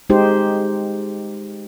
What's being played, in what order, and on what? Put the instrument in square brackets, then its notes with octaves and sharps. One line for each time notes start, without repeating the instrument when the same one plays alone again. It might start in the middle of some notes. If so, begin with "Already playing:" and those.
[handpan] G#3 D#4 G4 C5